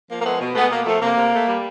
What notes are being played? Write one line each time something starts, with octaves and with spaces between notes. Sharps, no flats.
F3 A#3
A#3
G#3 A3 B3
B2
G#3 A3 B3
B2 A#3
F3 A3
C3 A#3
C3
A3
G3